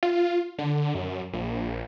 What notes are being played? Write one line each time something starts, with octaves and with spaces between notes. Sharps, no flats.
F4
D3
F#2
A#1